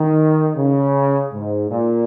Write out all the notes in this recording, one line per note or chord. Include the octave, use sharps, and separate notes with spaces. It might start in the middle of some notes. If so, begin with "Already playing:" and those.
Already playing: D#3
C#3
G#2
A#2